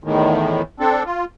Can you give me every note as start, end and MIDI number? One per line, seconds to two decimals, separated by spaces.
0.04 0.62 40
0.04 0.62 45
0.04 0.62 51
0.80 1.03 60
0.80 1.03 62
0.80 1.03 69
1.06 1.25 65